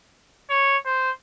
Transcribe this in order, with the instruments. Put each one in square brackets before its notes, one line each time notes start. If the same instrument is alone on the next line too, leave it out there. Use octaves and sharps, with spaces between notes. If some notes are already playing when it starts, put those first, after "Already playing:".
[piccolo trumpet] C#5
C5